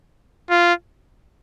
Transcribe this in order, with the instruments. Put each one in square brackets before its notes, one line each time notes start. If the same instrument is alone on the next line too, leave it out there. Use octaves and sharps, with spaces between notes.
[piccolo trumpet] F4